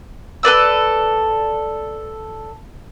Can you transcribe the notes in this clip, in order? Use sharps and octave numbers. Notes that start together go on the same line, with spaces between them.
A4 B4 D5 E6